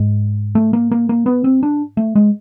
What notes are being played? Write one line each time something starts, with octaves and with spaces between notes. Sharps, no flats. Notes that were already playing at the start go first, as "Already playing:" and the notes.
Already playing: G#2 G#3
A3
A#3
A#3
A#3
B3
C4
D4
A3
G#3